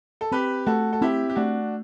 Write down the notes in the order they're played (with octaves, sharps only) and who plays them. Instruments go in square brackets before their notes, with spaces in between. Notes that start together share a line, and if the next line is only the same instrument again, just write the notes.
[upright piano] A4
[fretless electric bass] C4 [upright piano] G4 B4
[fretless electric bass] A3 [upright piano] F#4 A4
[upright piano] A4
[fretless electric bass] C4 [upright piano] E4 G4
[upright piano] G4
[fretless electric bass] A3 [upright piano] D4 F#4